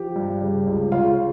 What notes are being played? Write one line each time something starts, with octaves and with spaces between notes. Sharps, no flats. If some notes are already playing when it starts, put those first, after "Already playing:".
Already playing: F3 G4
G2
C#3
C#2
C#3 F4